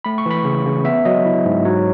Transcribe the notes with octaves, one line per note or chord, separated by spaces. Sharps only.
A3 B5
C#6
E3 B5
C#3
C#3
B3 E5
F#3 D#5
E4
G#2
F#3 C#5